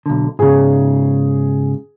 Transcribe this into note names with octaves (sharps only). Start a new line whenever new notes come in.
B1 D3
G#2 C#3 G#4